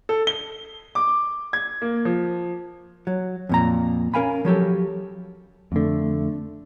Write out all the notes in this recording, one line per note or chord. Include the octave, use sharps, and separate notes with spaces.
A4
G7
D6
G#6
A#3
F3
F#3
F2 A#2 A#5
C#4 A#4 F5 G#5 B5
F3 F#3 G4 A4
F2 D3 A3